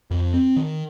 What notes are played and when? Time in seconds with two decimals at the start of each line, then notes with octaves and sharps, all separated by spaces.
0.11 F2
0.34 C4
0.56 D#3